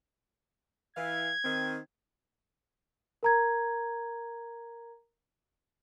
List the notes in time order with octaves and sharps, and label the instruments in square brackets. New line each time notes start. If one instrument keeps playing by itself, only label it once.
[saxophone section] E3 F5 [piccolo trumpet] G#6
[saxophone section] D#3 C4
[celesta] A#4 A#5 G#6